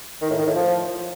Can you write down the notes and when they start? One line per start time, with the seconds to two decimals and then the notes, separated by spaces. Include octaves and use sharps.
0.22 D#3
0.30 A2
0.39 D#3
0.47 A2
0.55 F3